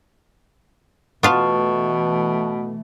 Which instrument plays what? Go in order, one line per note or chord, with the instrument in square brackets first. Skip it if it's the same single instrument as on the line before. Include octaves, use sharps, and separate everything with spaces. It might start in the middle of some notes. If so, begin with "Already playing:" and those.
[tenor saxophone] B2 [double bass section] E3 A3 [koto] B3 F4 F5 [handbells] A5 C#6